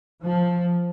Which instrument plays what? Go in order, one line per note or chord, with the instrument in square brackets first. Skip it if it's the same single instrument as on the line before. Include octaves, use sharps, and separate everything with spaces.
[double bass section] F3